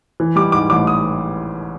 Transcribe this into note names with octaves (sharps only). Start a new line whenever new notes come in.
E3
G3 D6
G#2 D6
A1 D6
D#6